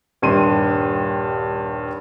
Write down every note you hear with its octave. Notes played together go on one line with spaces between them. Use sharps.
D#1 G2 C6 D#7